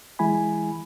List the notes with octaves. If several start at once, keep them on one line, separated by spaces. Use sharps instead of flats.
E3 G#3 E4 G#5 B5